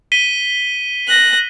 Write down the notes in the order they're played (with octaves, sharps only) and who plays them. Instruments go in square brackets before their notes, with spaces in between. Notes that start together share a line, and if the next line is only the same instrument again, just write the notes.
[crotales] B6 D#7 G7
[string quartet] F#6 A#6